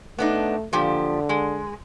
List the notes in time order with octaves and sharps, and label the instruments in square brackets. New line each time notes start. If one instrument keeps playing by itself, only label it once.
[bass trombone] A3 [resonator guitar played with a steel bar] B3 D4 D#4
[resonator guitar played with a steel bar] A#2 F3 G4 [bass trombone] D3
[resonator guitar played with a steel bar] G#3